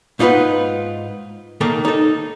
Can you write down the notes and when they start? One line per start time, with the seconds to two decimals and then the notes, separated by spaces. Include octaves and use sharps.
0.19 G#2 D#4 F4 F#4 B4 F#5
1.61 D#3 A3 A#3 A4
1.85 D#4 A4